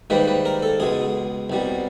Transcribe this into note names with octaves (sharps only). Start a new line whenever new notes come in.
G#2 D#3 G3 A#3 B4
B4
A#4
A4
C#2 B2 G#3 G#4
C2 B2 G3